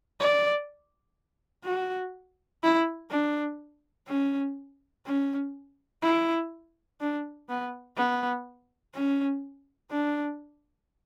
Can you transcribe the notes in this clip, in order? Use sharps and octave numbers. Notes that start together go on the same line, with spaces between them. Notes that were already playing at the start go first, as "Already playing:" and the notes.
D5
F#4
E4
D4
C#4
C#4
E4
D4
B3
B3
C#4
D4